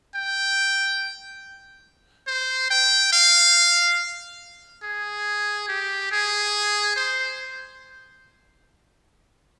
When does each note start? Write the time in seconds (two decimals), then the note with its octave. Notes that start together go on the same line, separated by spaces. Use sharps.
0.15 G5
2.27 C5
2.71 G5
3.13 F5
4.83 G#4
5.68 G4
6.11 G#4
6.96 C5